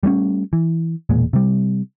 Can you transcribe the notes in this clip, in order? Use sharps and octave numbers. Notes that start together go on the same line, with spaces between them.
G3 A3 C4 C#4
E3
E1 A#2 G#3
C3 G3